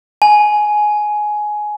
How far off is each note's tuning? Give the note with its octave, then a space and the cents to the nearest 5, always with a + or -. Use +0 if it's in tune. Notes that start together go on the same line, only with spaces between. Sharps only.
G#5 +15